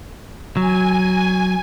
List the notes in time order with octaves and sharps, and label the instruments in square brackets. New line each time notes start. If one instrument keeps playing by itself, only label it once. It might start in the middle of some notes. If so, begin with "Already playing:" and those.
[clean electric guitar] F#3 [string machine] G#5